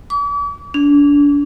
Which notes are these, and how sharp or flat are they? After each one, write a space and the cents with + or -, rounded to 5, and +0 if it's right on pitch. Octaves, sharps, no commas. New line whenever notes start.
D6 -45
D4 -30